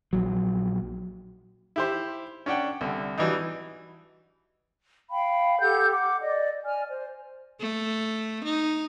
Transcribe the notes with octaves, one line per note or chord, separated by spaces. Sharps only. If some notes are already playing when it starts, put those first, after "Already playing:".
A#1 F#3
E4 G4 C5
C#4 D4 F#5 G5
C2 D3
E3 F#3 G3 D4 D#4
F5 G5 B5
G4 A4 F#5 G6
F#5 D6
D5 D#5
D5 G#5 F6
C5
A3
D#4